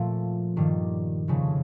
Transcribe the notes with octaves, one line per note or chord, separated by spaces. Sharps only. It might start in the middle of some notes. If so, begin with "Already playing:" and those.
Already playing: A#2 F3 A3
G2 D#3 G3
F1 F2 C#3 F3 A3